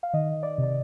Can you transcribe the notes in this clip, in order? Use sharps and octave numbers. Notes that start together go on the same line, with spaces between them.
F5
D#3 D#5
D5
C3
D5